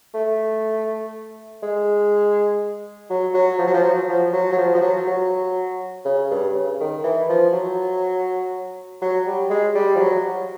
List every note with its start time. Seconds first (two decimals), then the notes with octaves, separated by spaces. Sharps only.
0.14 A3
1.63 G#3
3.10 F#3
3.34 F#3
3.59 F3
3.67 F#3
3.74 F3
3.84 F#3
4.09 F3
4.33 F#3
4.52 F#3
4.58 F3
4.75 F3
4.82 F#3
5.07 F#3
6.05 C#3
6.31 G2
6.55 C#3
6.80 D#3
7.04 E3
7.29 F3
7.53 F#3
9.02 F#3
9.27 G3
9.50 G#3
9.75 G3
9.95 F3
10.00 F#3